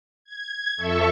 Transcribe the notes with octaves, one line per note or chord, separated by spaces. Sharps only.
G#6
F2 A4 E5 C#6